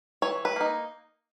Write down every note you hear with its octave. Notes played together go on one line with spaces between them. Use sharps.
E3 C#5
B4
A#3 D#4